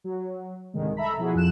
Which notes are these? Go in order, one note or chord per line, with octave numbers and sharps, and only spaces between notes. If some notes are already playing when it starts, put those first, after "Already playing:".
F#3
C2 G#2 D3 D#3 G#3
A4 E5 A#5 B5
B2 F3 E4 F#4 G#4
F2 F3 F#6 E7